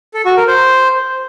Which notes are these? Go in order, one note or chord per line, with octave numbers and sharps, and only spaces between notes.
A4
F#4
A#4
C5